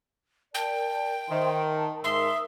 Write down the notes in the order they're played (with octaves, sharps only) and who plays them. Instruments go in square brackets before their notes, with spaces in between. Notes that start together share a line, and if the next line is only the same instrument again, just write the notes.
[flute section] A#4 D5 A5 [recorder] G5
[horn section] D#3 [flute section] C5 E5 C6
[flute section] A5 A#5
[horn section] G#2 C6 [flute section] A#4 D#6 E6 [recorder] E5